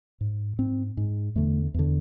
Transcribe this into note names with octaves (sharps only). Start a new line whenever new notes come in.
G#2
G#2 C4
G#2
E2 D3 A3
E2 D3